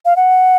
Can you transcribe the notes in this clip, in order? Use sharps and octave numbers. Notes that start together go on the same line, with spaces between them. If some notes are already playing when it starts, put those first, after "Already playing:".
F5
F#5